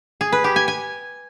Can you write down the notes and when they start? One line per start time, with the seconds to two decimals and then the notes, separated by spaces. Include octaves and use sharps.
0.21 G#4
0.32 B4
0.44 G4
0.56 G#5
0.68 G#5